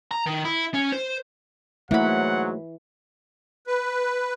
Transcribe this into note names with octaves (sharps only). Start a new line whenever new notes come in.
A#5
D#3
E4
C#4
C5
G#2 E3 F#3 A3 A#3 F#5 B5
B4